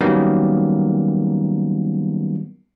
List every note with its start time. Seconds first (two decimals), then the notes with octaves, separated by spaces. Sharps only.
0.01 D#3 F#3 G3 A#3 B3 C#4